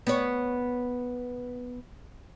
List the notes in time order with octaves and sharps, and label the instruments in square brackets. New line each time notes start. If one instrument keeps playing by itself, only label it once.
[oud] B3 C#5